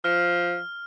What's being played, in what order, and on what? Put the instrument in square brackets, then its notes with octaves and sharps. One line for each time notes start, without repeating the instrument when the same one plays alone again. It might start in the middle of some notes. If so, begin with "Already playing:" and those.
[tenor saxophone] F3 [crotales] F6